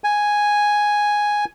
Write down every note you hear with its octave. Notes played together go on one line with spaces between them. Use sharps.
G#5